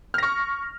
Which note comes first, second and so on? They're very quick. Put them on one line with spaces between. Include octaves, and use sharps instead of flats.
F6 A#6 C#6